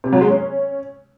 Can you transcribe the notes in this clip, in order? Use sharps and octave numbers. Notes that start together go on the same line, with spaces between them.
C3
F#3
G#3
C#4